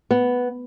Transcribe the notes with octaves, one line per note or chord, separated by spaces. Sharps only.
B3